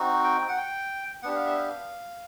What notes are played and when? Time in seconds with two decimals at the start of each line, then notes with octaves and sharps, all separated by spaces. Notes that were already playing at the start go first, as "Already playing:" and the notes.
Already playing: C4 D#4 F#4
0.24 G5
0.48 F#5
0.57 G5
1.23 B3 D4 G4 F#5
1.35 F5
1.46 E5
1.57 F5